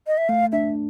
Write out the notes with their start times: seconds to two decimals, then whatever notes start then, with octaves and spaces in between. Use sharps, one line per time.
0.07 D#5
0.18 E5
0.29 A3 F5
0.52 D4 E5